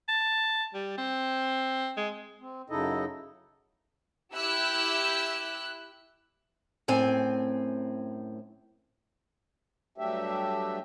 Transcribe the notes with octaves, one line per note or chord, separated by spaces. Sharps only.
A5
G3
C4
G#3
C4
F#2 C#3 D#4 E4 A4 D#5
E4 G4 E6 F#6
F#2 A2 C4 G#5
G2 F#3 A3 D4 G4 E5